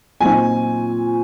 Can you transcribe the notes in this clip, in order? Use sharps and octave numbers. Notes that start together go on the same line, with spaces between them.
A#2 F#3 C4 D#4 G#5